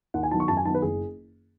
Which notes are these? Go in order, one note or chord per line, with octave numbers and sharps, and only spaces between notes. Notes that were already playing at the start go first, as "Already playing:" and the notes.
D#2 F#5
G#5
D#3 F#3 B3 D#4 A5
C#6
F#2 A5
G#5
D#3 F#3 B3 D#4 A5
B4
F#1 G#4